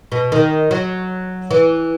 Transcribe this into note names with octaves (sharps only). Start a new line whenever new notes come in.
B2
D#3
F#3
E3